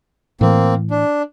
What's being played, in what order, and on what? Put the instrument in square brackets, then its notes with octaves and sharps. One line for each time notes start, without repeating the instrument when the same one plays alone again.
[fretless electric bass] A2 E3 [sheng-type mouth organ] A#3 C4
[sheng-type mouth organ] D4